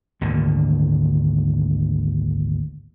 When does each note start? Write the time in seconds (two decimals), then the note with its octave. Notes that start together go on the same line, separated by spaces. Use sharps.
0.21 G#1 D2 A#2 D3